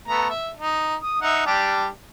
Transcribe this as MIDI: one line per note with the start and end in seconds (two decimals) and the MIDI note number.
0.08 0.28 57
0.08 0.28 59
0.08 0.28 82
0.29 0.51 76
0.57 0.95 63
1.01 1.21 87
1.21 1.43 63
1.21 1.43 76
1.21 1.43 78
1.46 1.87 55
1.46 1.87 62
1.46 1.87 67